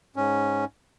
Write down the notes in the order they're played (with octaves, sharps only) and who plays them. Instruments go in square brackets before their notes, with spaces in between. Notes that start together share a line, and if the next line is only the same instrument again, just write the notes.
[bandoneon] G#2 C#4